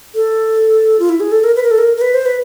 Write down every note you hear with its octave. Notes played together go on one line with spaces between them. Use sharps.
A4
F4
E4
G#4
A4
A#4
B4
A#4
A4
A#4
A#4
B4
C5
B4